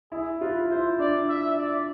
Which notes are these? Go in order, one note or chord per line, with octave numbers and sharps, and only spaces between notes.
E4 G#4
F4 B4
E4 C5
D4 D5
E5
D5